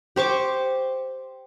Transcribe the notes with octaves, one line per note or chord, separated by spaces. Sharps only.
G4 C5 C#6 D6